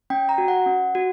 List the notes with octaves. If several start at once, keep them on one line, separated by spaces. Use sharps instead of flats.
C#4 G5
A#5
F#4
F#5
C#4
F#4